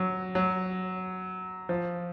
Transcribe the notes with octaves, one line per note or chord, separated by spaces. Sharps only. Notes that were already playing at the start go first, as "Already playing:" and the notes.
Already playing: F#3
F#3
F3